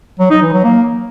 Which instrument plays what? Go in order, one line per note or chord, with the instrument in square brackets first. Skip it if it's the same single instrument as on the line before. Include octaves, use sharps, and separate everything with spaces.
[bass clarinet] F#3
D#4
E3
F#3
A#3